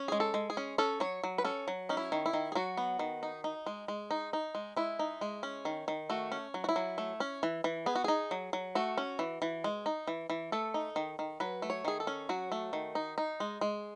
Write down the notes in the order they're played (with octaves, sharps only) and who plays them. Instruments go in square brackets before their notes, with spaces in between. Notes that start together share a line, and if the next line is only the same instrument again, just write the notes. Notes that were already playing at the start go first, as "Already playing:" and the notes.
Already playing: [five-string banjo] C#4
G#3 G#4
A4
G#3
G#4
C#4
C#4 A4
F#3 C#5
F#3
B4
C#4 A4
F#3
C#4 D#4
E4
D#3
E4
D#3
G#4
F#3 F#4
B3
D#3
D#4
D#4
G#3
G#3
D#4
D#4
G#3
G#3 E4
D#4
G#3
C#4
D#3
D#3
A3 F#4
C#4
F#3
F#4
E4
F#3
A3
C#4
E3
E3
B3 G#4
F#4
D#4 G#4
F#3
F#3
A3 F#4
C#4
E3
E3
G#3
D#4
E3
E3
A3 A4
D#4
D#3
D#3
F#3 B4
A3
C#5
D#3 G#4
A4
C#4
F#3 F#4
A3
D#3
D#4
D#4
G#3
G#3